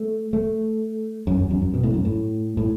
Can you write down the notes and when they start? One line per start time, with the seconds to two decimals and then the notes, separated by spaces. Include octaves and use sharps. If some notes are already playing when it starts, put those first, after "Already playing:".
Already playing: A3
0.33 A3
1.27 F#2
1.39 E2
1.50 F#2
1.62 F#2
1.74 B2
1.83 A2
1.94 F#2
2.05 A2
2.57 A2